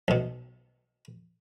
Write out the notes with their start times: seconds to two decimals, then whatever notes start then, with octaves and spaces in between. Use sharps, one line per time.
0.08 B1 B2